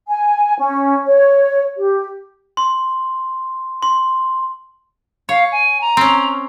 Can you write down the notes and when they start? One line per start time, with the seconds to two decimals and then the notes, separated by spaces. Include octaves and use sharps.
0.08 G#5
0.59 C#4
1.06 C#5
1.77 G4
2.57 C6
3.82 C6
5.29 C#5 F5
5.51 G#5
5.81 A#5
5.97 C4 C#4